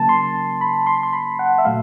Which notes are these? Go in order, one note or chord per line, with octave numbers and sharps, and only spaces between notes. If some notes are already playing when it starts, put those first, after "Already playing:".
Already playing: C#3 F#3 A#3 A5
C6
B5
C6
C6
B5
F#5
E5
A#2 F#3 A3 F5